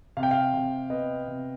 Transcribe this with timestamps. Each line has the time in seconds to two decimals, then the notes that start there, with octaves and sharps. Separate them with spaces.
0.17 C3 F5
0.23 G5
0.31 F5
0.54 C3
0.90 B3 D#5
1.28 C3